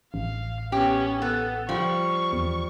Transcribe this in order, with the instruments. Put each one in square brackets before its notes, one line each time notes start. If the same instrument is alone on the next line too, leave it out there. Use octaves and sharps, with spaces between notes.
[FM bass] A1 [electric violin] F5
[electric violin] B3 C#4 [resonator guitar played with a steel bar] G4
[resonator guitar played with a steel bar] B3 [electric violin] A4
[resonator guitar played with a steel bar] F3 G3 [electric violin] C#6
[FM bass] E2